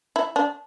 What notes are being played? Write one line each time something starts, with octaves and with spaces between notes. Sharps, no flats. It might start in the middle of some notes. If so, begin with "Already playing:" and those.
E4
D4